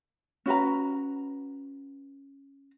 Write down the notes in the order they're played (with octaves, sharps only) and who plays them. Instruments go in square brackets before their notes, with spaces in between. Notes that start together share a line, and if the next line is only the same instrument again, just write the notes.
[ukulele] C#4 F#4 B4 A#5